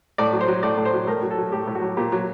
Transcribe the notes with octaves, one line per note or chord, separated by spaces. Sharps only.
A2 D5
F#3
C5
F#3
A2 D5
A2
C5
F#3
A2 A#4
F#3
A4
F#3
A2 G4
A2
F#4
F#3
A#2 G4
F#3